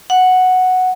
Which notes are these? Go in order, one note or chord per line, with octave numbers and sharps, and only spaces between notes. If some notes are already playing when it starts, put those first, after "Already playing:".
F#5